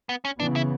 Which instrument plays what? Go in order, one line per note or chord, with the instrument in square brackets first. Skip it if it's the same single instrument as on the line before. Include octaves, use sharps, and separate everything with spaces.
[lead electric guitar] B3
C#4
[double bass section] C#3 E3 B3 [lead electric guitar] D4
[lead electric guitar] E4